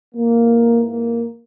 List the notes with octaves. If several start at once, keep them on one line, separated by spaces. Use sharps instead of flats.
G#2 E3 A#3
A#3